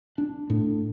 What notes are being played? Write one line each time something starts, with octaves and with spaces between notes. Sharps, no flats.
D4
A2